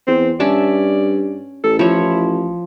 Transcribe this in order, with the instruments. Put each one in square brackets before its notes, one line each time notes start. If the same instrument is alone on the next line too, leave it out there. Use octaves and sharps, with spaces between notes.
[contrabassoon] E2 [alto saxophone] C4
[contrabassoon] G2 [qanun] C#4 E5 A5 [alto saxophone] D5
[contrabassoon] A1 [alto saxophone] A4
[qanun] F3 C#5 [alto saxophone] E4